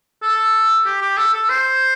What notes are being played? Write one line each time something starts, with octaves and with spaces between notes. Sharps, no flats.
A4
G4
G4
A4
A4
C5